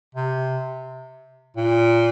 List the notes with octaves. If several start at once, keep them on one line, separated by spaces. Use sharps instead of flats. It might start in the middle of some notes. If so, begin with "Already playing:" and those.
C3
A#2